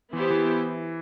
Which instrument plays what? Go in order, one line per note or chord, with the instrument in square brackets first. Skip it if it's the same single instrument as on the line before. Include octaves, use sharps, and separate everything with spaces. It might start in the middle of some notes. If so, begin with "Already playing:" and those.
[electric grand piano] E3 [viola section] B3 E4 G4 C5
[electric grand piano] E3